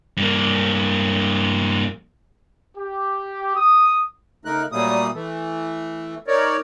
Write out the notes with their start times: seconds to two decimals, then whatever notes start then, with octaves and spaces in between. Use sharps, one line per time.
0.17 G2 A#3
2.77 G4
3.56 D#6
4.45 C#3 A3 D#4 A#4 F#6
4.72 A#2 F#3 G3 A3 A#3 D#6
5.14 E3 A3
6.27 D#4 A#4 C#5 D5